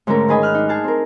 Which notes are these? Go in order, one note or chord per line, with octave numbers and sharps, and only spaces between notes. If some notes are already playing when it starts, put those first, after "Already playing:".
G#2 D3 A3 C#4 A#4
D#3 G#4 B4 D#5 G#5
B4 F6 F#6
D4 D#4
G#4 A5 F6
C4 A#4